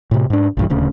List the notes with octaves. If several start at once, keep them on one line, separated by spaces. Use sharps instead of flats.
A2 C3
G#2 D4
A#1 G2 E3
D#1 D2 C#3